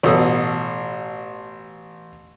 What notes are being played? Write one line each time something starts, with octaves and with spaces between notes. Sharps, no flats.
A1 B2 A4 D#6